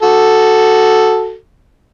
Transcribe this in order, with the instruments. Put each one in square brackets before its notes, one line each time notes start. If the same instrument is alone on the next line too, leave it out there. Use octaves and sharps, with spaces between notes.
[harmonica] F#4 A4